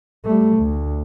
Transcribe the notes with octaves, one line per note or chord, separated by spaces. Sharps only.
G3 A3
D2